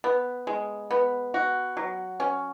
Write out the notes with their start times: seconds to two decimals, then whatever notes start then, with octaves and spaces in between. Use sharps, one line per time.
0.04 B3
0.47 G#3
0.91 B3
1.34 F#4
1.77 F#3
2.20 C#4